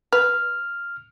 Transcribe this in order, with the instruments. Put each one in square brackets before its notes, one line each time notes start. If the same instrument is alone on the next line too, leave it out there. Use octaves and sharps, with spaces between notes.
[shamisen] B4 [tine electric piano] F6